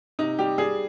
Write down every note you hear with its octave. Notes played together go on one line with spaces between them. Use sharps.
C3 D#4
G3 G4
G3 G#4